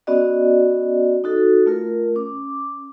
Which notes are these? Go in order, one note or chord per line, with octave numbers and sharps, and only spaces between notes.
B3 C#4 F#4 D5 D#5
D#4 F#4 A4
A3 F4 A#4
C#4 D6